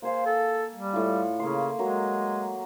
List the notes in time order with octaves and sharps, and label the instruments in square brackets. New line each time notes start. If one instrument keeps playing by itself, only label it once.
[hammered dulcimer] A#3 G#4 F5 [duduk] C5
[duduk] A4
G3
[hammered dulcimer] A2 F4
[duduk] C#3 [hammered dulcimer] A#3 C6
[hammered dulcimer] F#3 A#4 [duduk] G#3